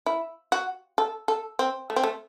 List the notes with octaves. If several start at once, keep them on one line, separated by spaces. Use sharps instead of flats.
E4
F#4
A4
A4
C4
A3
C4
A3